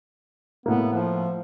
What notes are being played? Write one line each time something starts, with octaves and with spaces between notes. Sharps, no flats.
A2 A#3 B3
F3